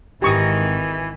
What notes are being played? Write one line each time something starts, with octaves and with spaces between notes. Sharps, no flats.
G#1 D#3 E3 G4 C#6 D#6